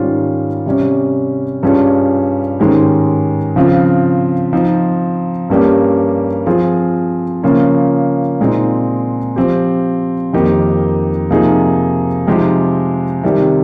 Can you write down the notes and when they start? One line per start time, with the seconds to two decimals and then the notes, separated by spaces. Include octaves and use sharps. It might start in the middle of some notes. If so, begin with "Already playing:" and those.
Already playing: G#2 D#3 G3 C#4 F4
0.66 C3 G3 C#4
1.63 G2 G3 C#4 F4 G#4
2.59 G#2 D#3 G#3 C#4 G4
3.56 C#3 F3 C4 F4
4.53 F3 C4 D#4
5.50 G2 G3 A#3 C#4 G4
6.46 F3 C4 F4 G#4
7.43 C#3 F3 A#3 C#4 F4
8.40 A#2 G#3 C4 D#4
9.36 F3 C4 G4
10.33 F2 D#3 A#3 D#4 G4
11.31 C3 F3 A#3 D#4 G#4
12.27 C3 F3 G#3 D#4 G4
13.23 C3 D#3 G3